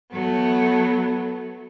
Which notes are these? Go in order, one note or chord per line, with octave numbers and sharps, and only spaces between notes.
F#3 A3 B3